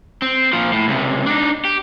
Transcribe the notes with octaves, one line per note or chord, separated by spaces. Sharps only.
C4
A#2 F3
A2
C#2 C3
D4 D#4
G4